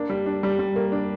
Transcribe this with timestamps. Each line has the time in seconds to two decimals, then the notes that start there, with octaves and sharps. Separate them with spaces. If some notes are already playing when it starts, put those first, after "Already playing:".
Already playing: A#3 D4
0.10 G3
0.26 D4
0.43 G3
0.59 G3
0.76 A#3
0.92 D4